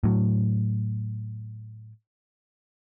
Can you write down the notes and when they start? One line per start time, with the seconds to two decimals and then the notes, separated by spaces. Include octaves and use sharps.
0.04 A2 F#3